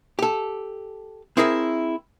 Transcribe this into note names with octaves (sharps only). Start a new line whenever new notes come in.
G4 A4
C4 E4 G#4 A#4 C5 E5